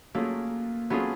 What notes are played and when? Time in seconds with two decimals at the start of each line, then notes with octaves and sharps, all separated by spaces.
0.14 F#3 A3 A#3 C#4 F4 G#4
0.90 F#3 A3 B3 C#4 F4 G#4